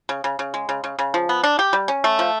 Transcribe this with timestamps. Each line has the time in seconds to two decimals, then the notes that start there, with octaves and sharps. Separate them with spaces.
0.09 C#3
0.24 C#3
0.39 C#3
0.54 G#3
0.69 C#3
0.84 C#3
0.99 C#3
1.14 F3
1.29 B3
1.44 D4
1.59 G4
1.73 G3
1.88 C#4
2.04 A3
2.19 F3